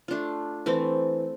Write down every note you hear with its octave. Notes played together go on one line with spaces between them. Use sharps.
A3 D4 F4
E3 A3 C4